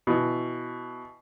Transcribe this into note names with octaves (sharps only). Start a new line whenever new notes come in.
B2 E3